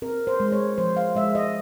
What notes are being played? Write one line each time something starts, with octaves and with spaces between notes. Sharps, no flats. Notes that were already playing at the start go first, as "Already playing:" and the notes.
C4 A#4
C5
G#3
C#5
F3 C5
F5
G#3 E5
D#5